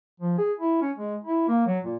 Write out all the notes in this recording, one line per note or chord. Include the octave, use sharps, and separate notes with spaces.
F3
G#4
E4
C#4
G#3
E4
A#3
F#3
A#2